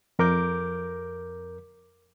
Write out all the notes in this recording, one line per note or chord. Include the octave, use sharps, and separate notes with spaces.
F2 A#4 D6 G6